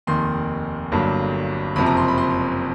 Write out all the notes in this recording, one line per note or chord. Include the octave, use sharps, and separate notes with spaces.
F1 D#2 D#3 C6
G1 G2 D3 F#3 A#3
F#1 F2 C3 F3 B5
A#5
C6
B5
C6